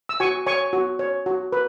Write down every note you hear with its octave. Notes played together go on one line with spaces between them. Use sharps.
E6
F#4 G#5 C#6
C#5 G#5 C#6
F#4
C#5
F#4
B4